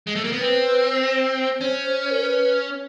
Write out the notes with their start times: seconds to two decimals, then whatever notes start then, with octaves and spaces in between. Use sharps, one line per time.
0.07 G#3
0.15 A3
0.24 A#3
0.32 B3
0.41 C4 B4
0.61 B4
0.81 C5
1.61 C#4
2.11 A#4
2.21 B4